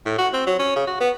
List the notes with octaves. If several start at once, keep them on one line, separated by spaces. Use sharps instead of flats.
A2
F#4
C4
F#3
C#4
C#3
F#4
B3